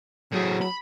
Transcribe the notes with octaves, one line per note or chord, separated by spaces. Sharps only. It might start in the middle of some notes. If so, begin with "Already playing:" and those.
A2 F#3 G#4
B5